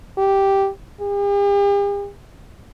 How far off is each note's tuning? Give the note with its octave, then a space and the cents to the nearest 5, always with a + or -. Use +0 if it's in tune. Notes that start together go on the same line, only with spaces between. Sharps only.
G4 -5
G4 +45